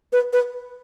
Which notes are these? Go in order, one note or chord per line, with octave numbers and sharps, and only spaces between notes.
B4
B4